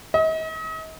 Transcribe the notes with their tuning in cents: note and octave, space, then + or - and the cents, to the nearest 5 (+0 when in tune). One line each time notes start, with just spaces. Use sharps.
D#5 +40